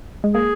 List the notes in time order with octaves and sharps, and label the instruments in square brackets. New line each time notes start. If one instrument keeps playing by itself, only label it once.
[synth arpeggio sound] G#3
[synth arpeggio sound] A#3 [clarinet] G#4